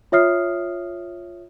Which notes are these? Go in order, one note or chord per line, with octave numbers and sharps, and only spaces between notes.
F4 C#5 E5 D#6 F6 C7